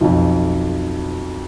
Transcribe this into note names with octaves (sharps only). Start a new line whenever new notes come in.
B1 F2